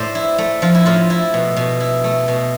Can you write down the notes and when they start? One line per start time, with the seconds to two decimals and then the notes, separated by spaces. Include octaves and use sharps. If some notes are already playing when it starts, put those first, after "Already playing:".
Already playing: A2 C5 D5
0.15 E4
0.38 A3
0.62 F3 F4
0.75 E4
0.86 A2 F4
1.10 E4
1.34 B2
1.56 B2
1.80 E4
2.04 A3
2.28 B2